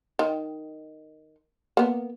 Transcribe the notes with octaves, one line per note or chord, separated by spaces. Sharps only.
D#3
A#3 B3